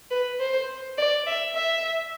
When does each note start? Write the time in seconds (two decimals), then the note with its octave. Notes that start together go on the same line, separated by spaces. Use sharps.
0.11 B4
0.40 C5
0.98 D5
1.27 E5
1.55 E5